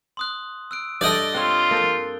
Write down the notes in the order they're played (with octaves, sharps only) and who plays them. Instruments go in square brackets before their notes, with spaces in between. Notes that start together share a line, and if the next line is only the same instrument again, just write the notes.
[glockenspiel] C6 D#6 F#6
E6 F#6 D7
[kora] G2 A4 [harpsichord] D5 D#5 [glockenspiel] F#6 G6 A6
[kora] C4 C#5 [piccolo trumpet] F4 [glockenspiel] F#6 G7
[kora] A#3 A4 C5